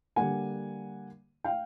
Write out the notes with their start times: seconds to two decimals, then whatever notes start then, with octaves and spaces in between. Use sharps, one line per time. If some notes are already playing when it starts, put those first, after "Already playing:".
0.16 D3 G3 A#3 F#5 G#5
1.44 F5 G5